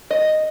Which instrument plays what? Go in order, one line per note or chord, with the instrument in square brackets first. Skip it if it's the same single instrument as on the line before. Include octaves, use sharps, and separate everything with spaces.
[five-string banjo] D#5